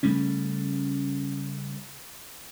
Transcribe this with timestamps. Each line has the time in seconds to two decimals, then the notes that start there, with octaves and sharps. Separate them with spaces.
0.03 C#3 G3 A3 C#4